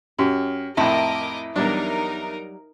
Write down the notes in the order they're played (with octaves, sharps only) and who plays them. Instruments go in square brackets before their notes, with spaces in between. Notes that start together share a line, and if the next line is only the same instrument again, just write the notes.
[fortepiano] F#2 [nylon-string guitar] C#4 G4
[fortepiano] F2 A2 [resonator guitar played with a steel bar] E4 [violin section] A#4 D#5 D6 [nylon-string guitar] A5
[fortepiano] E2 D4 [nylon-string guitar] F#3 G3 [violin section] D#4 A#4